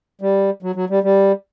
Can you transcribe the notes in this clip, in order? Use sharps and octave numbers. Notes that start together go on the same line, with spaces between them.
G3
F#3
F#3
G3
G3